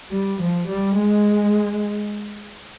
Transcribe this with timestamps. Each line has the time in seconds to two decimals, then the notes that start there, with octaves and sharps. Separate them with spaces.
0.11 G3
0.40 F3
0.68 G3
0.98 G#3